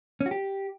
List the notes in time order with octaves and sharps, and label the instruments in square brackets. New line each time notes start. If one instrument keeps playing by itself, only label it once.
[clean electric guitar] C#4
F#4
G4